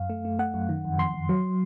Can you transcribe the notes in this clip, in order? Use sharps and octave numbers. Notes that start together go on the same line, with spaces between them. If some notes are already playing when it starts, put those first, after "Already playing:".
Already playing: F#2 F5
A3
A3
A3 F#5
F#2
D#3
F2
F2 C6
F2
F#3